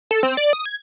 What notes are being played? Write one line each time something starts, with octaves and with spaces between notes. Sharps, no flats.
A4
C4
D5
D#6
G#6